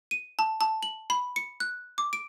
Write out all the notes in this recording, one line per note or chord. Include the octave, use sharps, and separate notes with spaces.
D#7
A5
A5
F#7
B5
C#7
F#6
D6
D7